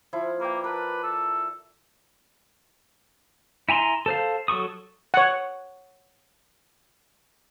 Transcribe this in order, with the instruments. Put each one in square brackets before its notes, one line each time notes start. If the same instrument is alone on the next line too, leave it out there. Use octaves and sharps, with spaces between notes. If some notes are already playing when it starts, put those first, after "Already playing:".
[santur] F3 E4 F5
[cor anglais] A#3 [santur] B4 D5 G5
[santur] A#4 A5 [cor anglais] B4
[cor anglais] A4
[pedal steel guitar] E4 G#5 A#5 C6
A4 C5 F5
F#3 A4 C#6 D#6
[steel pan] C#5 F#5